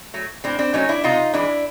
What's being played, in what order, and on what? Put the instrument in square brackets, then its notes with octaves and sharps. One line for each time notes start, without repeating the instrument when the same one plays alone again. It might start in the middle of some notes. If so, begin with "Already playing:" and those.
[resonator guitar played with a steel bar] F#3 A3
A2 C4 D4
C4 D4
F#3 A3 C#4 D#4
D4 E4
C3 D#4 F4
E3 G#3 D4 E4